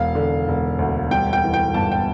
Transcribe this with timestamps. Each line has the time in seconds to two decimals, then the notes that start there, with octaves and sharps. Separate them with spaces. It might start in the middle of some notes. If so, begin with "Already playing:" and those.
Already playing: E1 F5
0.15 D3
0.48 E1
0.79 D2
1.11 G3 G5
1.33 G5
1.44 E3
1.54 G5
1.74 G1 A5
1.92 G5